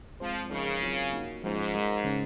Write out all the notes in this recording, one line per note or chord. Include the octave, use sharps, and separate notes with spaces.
F3 G#3 C4 F4 C5
C#3 F3 G#3 D#4 A#4
F#3 C4 F4 A#4 C#5
A#3 D#4 F#4
G#2 F3 G#3 C#4 F4 C5
G#3 D#4 A#4 D#5
C#3 G#3 C#4